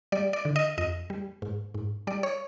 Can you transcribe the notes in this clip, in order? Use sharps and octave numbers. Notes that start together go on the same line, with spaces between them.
G3 D5
D5
D3
D#5
F2 D#5
G3
G#2
G#2
G3 D5
C#5